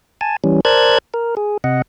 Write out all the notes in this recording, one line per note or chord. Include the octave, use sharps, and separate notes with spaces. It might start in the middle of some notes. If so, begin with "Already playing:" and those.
G#5 A5
E3 G3 C#4
A#4 C5 D5 A5 F#6 G#6
A#4
G#4
C3 D#5 F#5